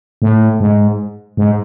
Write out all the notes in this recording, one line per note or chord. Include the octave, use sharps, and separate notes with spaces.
A2
G#2
G#2